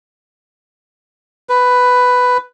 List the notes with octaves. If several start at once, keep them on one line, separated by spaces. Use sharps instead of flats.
B4